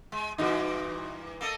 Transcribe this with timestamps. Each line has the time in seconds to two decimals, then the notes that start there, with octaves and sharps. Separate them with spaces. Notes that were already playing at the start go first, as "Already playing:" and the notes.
0.12 G#3
0.38 G2 A#2 E3 D#4 F#4
1.41 A#3 A4 D#5